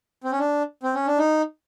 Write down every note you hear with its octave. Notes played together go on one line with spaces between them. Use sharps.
C4
C#4
D4
C4
C#4
D4
D#4